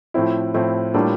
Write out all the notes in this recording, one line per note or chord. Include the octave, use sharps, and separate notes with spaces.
A2 F3 C4 E4
A2 F3 C4 E4
A2 G3 A#3 D4 F4